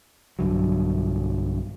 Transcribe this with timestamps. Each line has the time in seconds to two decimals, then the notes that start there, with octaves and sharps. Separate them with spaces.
0.39 B1 G2 D3 F#3